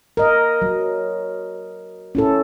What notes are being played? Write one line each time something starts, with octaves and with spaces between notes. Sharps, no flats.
A#4 D#5
F#3
C#4 E4 A4